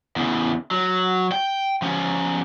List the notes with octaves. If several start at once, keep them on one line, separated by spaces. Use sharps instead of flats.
E2 C#3
F#3
G5
F3 C#4